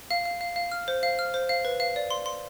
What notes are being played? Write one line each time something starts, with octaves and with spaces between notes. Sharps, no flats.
F5
F5
F5
F5
F6
C5
F5
F6
C5
F5
B4
F5
D5
C6
C6